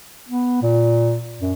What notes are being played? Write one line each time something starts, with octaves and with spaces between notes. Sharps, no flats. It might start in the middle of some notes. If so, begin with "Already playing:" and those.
B3
A#2
F#2